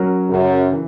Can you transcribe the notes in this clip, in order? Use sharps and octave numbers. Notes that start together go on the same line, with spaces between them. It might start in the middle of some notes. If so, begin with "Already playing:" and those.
Already playing: F#3 C#4 F#4 A#4
F#2 C#3
E3